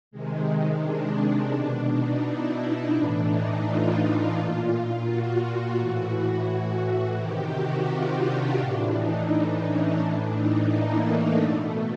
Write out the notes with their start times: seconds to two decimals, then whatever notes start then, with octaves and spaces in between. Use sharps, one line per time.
0.11 C3 D#3 G#3
0.47 G#3
0.81 D4
1.52 B2
1.87 D#4
2.23 E4
2.58 D#4
2.93 A2 E3 D4
3.28 D#4
3.64 F4
3.99 F4
4.35 A#2
5.04 F#4
5.75 A2 E3
6.11 F#4
7.16 C3 D#3 G4
7.52 F#4
7.87 F4
8.22 D4
8.57 A2 E3 D4
8.92 D#4
9.29 D4
9.63 C#4
9.99 A2 E3 D4
10.34 D#4
10.68 A#3
11.04 A3
11.40 B2 A3